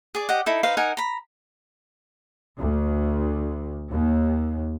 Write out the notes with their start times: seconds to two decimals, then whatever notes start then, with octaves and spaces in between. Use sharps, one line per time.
0.15 G#4 D5
0.29 G4 D#5 F#5
0.46 D#4 E4 A4
0.63 D#4 B4 C5 F5
0.77 D#4 A#4 F#5 G#5
0.97 A#5 B5
2.59 D2
3.90 D#2